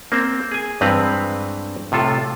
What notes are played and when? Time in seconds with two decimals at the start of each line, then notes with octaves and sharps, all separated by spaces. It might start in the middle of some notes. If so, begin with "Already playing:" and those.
0.12 A#3 C4 C5
0.52 G#4 G#5
0.81 G2 E3 G#3 C4 B4 A#5
1.92 A2 C3 F4 A4